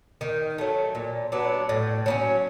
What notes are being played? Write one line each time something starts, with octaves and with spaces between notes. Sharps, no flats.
D#3
F#3 A3
A#2
F#3 B3 D4
A2
F#3 A#3 C#4